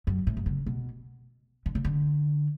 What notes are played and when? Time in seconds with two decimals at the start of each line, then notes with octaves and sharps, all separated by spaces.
0.07 F#2
0.27 A2
0.37 F#2
0.46 C#3
0.66 B2
1.66 D3
1.75 C#3
1.84 D3